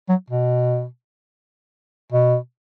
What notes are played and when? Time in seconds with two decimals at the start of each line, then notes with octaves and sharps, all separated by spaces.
0.09 F#3
0.30 B2
2.12 B2